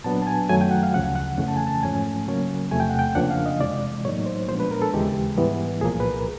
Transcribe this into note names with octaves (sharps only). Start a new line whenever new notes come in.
A#2 F#3 B3 D4 A5
A5
G#5
F#2 D#3 F#3 A3 G#5
G5
F#5
F5
D2 C#3 F3 F#5
F#5
F2 C#3 E3 A3 C#4
A5
G#5
A5
G#2 F3 A3 C#4 G#5
C#3 F#3 A#3 C#4
E2 C3 F3 A3 G#5
G5
F#5
G5
F2 C#3 F3 A#3 D4 F#5
F5
D#5
C3 E3 G#3 D5
A2 F#3 A#3 D#4 C#5
C5
A#2 F3 G#3 B3 D4 C5
B4
A#4
A4
D#2 C#3 E3 G#3 G4
G#2 E3 G3 B3
C2 A#2 F3 A#3 G#4
B4
A#4